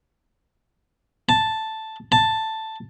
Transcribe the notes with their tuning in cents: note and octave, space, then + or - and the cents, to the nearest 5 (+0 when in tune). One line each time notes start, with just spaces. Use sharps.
A5 +0
A5 +5